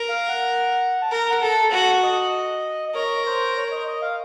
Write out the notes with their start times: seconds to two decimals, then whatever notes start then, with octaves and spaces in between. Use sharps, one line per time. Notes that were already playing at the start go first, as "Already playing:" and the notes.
Already playing: A#4
0.09 F5
0.28 F#5
1.02 A5
1.11 A#4 A#5
1.30 F#5
1.41 A4 A5
1.72 F#4 F#5
2.03 D#5
2.89 D#5
2.95 A#4 C#5
3.26 C5
3.57 C#5
3.68 C#5
3.71 D#5
3.87 D#5
4.02 F5